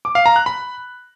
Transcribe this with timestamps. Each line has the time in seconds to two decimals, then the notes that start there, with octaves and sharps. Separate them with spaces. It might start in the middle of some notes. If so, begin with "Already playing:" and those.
0.05 D6
0.15 F5
0.26 A#5
0.36 F#6
0.46 B5